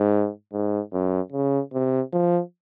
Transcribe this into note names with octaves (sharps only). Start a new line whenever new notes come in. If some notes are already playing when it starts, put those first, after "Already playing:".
Already playing: G#2
G#2
F#2
C#3
C3
F3